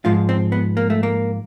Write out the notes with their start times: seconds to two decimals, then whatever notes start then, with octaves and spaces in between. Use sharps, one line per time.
0.05 G#2 F3 G#3 F4
0.29 C4
0.52 B3
0.77 A#3
0.90 A3
1.03 A#3